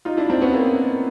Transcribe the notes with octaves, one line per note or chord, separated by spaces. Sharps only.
D#4 F4
D4 E4
C4 D4
B3 C#4
A#3 C4